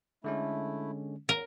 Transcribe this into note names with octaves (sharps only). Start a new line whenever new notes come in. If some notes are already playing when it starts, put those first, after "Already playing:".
D3 G#3 A3 C#4 E4
E2 A#4